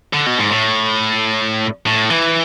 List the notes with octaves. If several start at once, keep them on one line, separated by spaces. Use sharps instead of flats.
D3
B2
G#2
A2
A2
E3